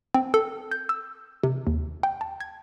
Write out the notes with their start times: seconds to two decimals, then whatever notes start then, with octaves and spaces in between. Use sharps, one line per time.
0.14 C4
0.34 A4
0.71 G6
0.89 E6
1.43 C3
1.67 D#2
2.03 G5
2.21 A5
2.40 G#6